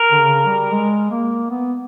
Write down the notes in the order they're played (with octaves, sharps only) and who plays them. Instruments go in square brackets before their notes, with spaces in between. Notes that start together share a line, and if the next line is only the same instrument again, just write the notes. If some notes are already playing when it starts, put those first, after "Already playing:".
Already playing: [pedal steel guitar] A#4
[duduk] D3
C#3
G3
G#3
A#3
B3